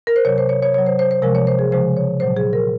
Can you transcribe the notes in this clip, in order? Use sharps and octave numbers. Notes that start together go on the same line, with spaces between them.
A#4
C5
C3 F#3 C#5
C5
C#5
C#5
C3 F#3 C#5
C5
C5
C5
C3 F3 G#3 A#4
C#5
C5
G#4
C#3 F3 G#3 C5
C#5
A#2 F#3 C5
G#4
A#4